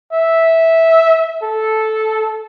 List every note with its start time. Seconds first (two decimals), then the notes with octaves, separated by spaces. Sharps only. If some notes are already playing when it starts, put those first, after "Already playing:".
0.13 E5
1.43 A4